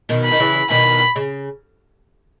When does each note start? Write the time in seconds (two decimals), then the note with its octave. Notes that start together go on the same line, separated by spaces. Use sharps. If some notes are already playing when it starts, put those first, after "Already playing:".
0.09 B2 D#3
0.25 B5
0.32 D#3
0.40 C#3 E3
0.70 B2 D#3 B5
1.16 C#3